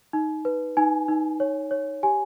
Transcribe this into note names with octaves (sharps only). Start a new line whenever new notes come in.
D#4
B4
D#4 G#5
D#4
C#5
C#5
G4 G#5